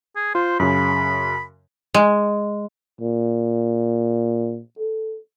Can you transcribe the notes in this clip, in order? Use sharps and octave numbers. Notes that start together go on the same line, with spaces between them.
G#4
F4 C5
F#2 C#3 B5
G#3
A#2
A4